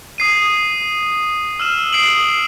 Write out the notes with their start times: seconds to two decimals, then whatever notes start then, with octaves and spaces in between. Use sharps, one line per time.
0.18 D#6 C7 D#7
1.60 E6 F6 E7
1.93 D#6 C7 D7 F#7